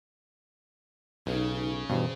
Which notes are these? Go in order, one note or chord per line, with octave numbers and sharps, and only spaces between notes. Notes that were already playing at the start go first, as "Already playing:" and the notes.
B1 C#3 D#4
G2 B2 E3 C5